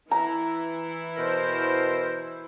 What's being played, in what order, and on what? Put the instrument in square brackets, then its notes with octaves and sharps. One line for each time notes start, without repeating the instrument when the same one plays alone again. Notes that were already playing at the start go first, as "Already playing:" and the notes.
[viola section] E3 E4 [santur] A#5
[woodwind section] B2 A#4 C5